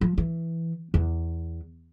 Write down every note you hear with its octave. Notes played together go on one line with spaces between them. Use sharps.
F3
E3
E2